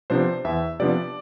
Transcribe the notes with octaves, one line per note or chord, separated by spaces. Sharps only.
C3 F3 B3 D4 C5
E2 E5
C3 F3 B3 D4 D5